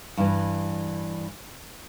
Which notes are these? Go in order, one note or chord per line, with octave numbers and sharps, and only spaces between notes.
G2 E3